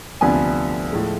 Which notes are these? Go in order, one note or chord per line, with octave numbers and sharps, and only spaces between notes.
D2 C3 F3 B3 D4 G#5
A2 F3 G#3